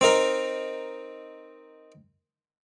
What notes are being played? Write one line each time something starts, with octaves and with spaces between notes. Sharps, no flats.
C4 D#4 A#4